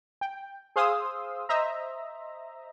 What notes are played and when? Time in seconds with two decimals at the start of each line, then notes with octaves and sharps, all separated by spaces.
0.21 G5
0.76 G#4 C5 F5 C6 D#6 E6
1.49 C5 D#5 E5 A#5